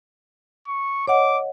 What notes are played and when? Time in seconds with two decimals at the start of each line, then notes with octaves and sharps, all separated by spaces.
0.67 C#6
1.08 C#5 D#5 F#5 D6